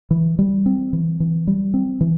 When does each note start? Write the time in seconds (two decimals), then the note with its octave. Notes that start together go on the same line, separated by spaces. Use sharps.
0.11 E3
0.39 G3
0.66 C4
0.93 E3
1.20 E3
1.47 G3
1.74 C4
2.01 E3